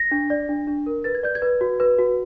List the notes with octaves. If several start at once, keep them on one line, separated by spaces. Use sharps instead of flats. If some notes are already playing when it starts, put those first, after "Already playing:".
Already playing: A#6
D4
D5
D4
D4
A#4
B4 A6
G#6
D5 G6
G#6
B4
F#4
B4
F#4